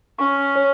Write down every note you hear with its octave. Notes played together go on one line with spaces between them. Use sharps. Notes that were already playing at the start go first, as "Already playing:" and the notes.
C#4 C#6
C#5